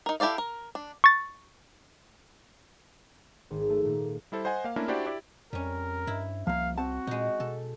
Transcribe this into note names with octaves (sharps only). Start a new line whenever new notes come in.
D#4 A#4
E4 G4 A4 D5 F5
A#4
D4
C#6 A6
G#1
A3
A#2
G3 E4 A4 C5
C5 D#5 F#5 G#5
A#3 F5
A3 A#3 C#4 D4 E4 A#4
D4 E4 F#4 G4 C5 D5
E4 G4 D5
F2 G3 C#4 A#4
G2 E4
C2 F3 A#3 F5
C4 F#4 F#5 A5
A#2 G#3 D#4
B2 A4